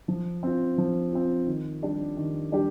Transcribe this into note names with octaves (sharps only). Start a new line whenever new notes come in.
F3
C4 F4
F3
C4 F4
D#3
G3 D4 G4
D#3
G3 D4 G4